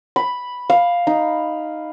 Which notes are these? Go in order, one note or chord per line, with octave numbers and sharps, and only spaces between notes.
B5
F5
D#4